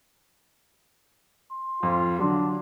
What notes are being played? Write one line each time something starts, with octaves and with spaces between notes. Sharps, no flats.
C6
F2 F4
D3 F#3 D4